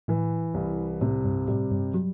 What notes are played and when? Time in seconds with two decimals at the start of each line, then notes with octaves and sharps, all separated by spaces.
0.08 A2 E3
0.54 C2
1.01 A2 C3
1.24 G2
1.48 A2 G3
1.71 G2
1.94 F#3 G3